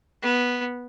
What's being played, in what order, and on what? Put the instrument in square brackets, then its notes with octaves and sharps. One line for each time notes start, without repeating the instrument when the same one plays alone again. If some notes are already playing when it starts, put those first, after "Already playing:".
[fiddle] B3